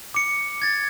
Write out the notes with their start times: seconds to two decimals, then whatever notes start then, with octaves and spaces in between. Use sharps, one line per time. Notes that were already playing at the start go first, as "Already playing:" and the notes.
0.14 D6 C#7
0.62 G#6 A6